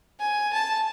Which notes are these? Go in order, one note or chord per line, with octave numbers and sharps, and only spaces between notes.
G#5
A5